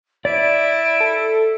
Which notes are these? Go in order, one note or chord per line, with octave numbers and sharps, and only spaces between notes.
E4 D5 D7
A4